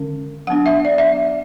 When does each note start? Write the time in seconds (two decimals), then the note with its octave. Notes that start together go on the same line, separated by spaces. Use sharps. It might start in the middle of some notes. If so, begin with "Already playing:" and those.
Already playing: D3 G#3 C#4
0.47 F#3 B3 D4 F#5
0.66 E5
0.85 D5
0.98 E5